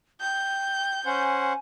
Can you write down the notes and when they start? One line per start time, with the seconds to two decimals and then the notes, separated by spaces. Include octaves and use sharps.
0.21 G5 G6
1.06 C#4 C5 F#5 G#5